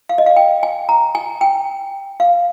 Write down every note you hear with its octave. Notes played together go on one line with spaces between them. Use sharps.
F5
D#5
F5
G5
G#5
A#5
G#5
G5
F5